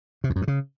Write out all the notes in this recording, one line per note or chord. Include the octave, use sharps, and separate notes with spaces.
C3
E2
F#2
G2
C#3